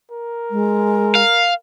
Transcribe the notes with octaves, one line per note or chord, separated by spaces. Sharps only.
A#4
G#3
F5